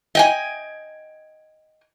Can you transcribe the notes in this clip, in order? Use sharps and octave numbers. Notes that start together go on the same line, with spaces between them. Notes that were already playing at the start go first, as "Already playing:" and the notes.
D#5 G5 G#5